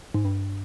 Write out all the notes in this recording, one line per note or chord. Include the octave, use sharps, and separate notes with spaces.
G#2
G2